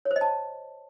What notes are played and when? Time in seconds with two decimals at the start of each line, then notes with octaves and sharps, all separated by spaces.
0.05 C#5
0.11 C5
0.16 D#5
0.21 A5